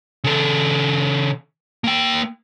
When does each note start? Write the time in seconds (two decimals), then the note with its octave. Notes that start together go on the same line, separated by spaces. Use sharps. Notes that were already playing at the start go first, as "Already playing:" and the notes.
0.24 C#3 A4
1.84 A#3 G5